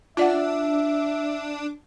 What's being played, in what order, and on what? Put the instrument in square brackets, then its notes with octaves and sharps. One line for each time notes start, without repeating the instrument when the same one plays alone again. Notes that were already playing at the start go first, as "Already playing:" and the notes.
[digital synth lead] D4 [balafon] F4 D5 F#5 [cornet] E5